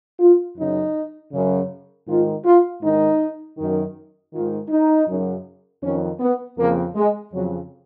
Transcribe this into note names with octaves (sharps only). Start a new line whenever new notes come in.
F4
F#2 C#3 D#4
F#2 C#3
G#2 D#3 F4
F4
G#2 D#3 D#4
F#2 D#3
G#2 D#3 F4
D#4
F#2 C#3
F2 D#3 C#4
B3
F2 C#3 A#3
G#3
F2 C#3 F#3